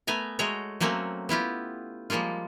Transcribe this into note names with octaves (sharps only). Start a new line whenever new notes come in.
A3 B3 G#5 A#5
G#3 A3 F#4 C#5 A#5
F#3 A3 A#3 C4 C#4 F#4
B3 E4 F4 G4
F3 G3 G#3 A#3 F4